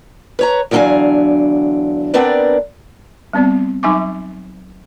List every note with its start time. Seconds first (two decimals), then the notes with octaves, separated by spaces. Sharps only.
0.39 B4 C#5 A#5
0.71 E2 D3 F#3 D4 F5 G#5
2.14 B3 C4 D4 A#4 B4 D5
3.33 G3 B3 C4 D5
3.83 F#3 D#4 E5 G#5 C#6 D6